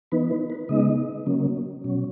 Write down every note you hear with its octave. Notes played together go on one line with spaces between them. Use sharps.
E3 B3 D#4 B4
B4
B4
C#3 G#3 B3 D#4 D#5
C#3 F#3 A#3 C#4
B2 F#3 C#4